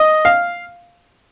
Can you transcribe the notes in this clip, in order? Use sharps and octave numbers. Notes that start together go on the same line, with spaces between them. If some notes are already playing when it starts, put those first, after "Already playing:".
Already playing: D#5
F5